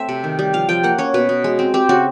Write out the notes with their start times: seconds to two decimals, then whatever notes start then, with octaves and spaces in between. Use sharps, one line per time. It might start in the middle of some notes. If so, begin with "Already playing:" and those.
Already playing: A3 C4 E5
0.09 C3
0.24 D#3
0.39 G3
0.53 F3 F5
0.69 F3 G5
0.83 A#3 F#5
0.98 C#4 C#5
1.14 B2 B4
1.29 B2
1.44 G#3
1.59 C4
1.74 C4 G4
1.89 C#3 F#4